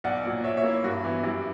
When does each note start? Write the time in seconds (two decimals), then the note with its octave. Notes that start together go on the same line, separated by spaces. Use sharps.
0.04 B1 D5 F#5
0.24 A#2 F#3
0.44 A#2 C#5 E5
0.57 C#5 E5
0.64 A#3 E4
0.84 G2 F#4
1.04 E3 B3 E4
1.23 F#2 E4 G4